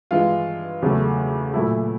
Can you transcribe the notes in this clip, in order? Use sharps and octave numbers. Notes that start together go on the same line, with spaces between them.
G2 E3 G#3 F4
E2 C#3 F#3 A3
A#2 F#3 A3 E4